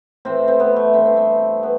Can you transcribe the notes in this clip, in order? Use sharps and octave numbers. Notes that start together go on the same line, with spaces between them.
A2 E3 C4
C4
B3
A3
G2 E3 C4
C4
C4
B3